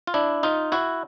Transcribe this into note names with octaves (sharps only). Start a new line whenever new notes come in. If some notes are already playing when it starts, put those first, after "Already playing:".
F4
D4 E4
D#4 F4
E4 F#4